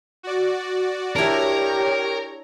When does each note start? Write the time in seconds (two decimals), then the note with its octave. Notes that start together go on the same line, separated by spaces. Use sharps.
0.23 F#4 D5
1.16 D4 E4 G4 A#4 C#5 A#5